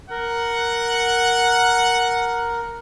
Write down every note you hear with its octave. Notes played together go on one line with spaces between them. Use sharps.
A#4 F#5